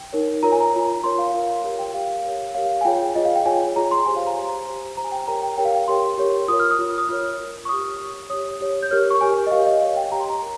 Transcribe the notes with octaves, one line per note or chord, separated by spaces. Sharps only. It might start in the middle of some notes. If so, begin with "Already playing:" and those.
Already playing: G5
D#4 A#4 C#5
F4 A#4 C#5 A#5
G#5
A#5
F4 A#4 C#5
F4 A#4 C#5 C6
F5
F4 A#4 C#5
G4 A#4 C#5
G5
G4 A#4 C#5 F5
G4 A#4 C#5
G4 A#4 C#5 F5
G#5
F4 G#4 C#5 G5
F4 G#4 C#5 D#5
F5
G5
F4 G#4 C#5 G#5
F4 G#4 C#5 A#5
C6
G4 C5 G#5
F5
A#5
G4 C5
G4 C5
G4 C5 A#5
G#5
G5
G4 A#4 C#5 A#5
G5
G4 A#4 C#5 G5
F5
G5
G4 A#4 C#5 C6
G4 A#4 C#5
F4 A#4 C#5 D#6
F6
D#6
F4 A#4 C#5
D#6
F4 A#4 C#5 F6
F4 A#4 C#5
C#6
G4 C#5 D#6
G4 C#5
G4 C#5 D#6
G4 C#5
G6
G4 A#4 C#5 F6
C#6
G4 A#4 C#5 G#5
D#5
G4 A#4 C#5 F5
D#5
G4 A#4 C#5 F5
G5
G4 A#4 C#5 A#5
C6
A#5
A#4